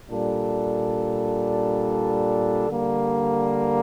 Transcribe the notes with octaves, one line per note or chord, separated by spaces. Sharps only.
A#2 G3 D4 A4
D3 G3 A#3